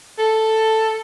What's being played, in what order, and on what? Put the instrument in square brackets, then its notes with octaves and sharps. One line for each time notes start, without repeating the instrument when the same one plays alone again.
[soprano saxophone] A4